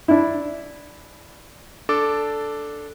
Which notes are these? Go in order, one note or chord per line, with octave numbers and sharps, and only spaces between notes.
D4 E4
D4 A4 D6